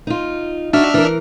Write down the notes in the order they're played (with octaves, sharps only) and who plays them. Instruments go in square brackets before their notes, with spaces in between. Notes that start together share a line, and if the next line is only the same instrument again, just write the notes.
[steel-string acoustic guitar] D#4 F4
[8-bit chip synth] D4 E5 F6 [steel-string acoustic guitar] D#4 F#4
[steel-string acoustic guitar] E3 A#4